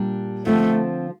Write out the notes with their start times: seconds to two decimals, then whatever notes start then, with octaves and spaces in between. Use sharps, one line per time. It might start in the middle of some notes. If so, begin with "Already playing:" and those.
Already playing: A#2 G3 D4
0.47 D3 F3 A3 C4 F4